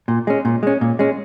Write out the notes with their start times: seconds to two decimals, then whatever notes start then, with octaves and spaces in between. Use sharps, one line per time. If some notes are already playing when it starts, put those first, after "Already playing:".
0.08 A#2
0.27 G#3 C#4
0.45 A#2
0.63 G#3 C#4
0.81 A#2
0.99 G#3 C#4